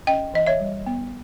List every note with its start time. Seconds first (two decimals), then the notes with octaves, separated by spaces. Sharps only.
0.07 C#4 D#5 G5
0.34 E3 D#5
0.47 C#5 E5
0.60 G3
0.86 B3